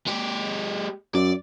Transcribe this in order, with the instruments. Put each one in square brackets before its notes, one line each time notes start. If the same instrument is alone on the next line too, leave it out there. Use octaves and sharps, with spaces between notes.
[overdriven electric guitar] G#3 G4
[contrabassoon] F#2 [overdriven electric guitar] D5